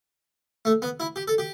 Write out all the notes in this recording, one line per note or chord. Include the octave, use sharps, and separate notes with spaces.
A3
B3
E4
G4
A4
G4